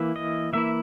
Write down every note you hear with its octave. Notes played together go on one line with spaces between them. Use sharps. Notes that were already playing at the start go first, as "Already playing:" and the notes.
Already playing: E3 A#3 E4
D#5
E3 A#3 E4 E5